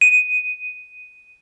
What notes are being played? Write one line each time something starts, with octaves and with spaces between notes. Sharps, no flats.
D#7